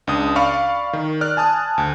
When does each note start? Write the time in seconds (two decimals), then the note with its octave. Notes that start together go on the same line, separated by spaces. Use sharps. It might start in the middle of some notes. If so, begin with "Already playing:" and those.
0.07 C#2 D4 D#6
0.36 D5 F5 B5 C#6 F6
0.93 D#3
1.21 D5 F6 F#6
1.37 G#5 A5 D#6 F#6
1.78 D2